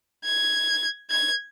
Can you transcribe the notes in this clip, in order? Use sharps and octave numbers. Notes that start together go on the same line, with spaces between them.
G#6
G#6